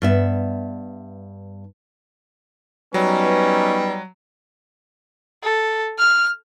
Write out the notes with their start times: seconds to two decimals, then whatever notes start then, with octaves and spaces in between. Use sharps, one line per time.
0.02 G2 B3 E5
2.94 F#3 G3 B3 C#4 D#4 B4
5.43 A4
5.98 F6